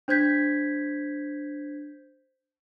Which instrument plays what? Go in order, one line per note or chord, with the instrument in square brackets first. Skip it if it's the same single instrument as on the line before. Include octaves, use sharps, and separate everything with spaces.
[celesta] D4 C5 G6 G#6 B6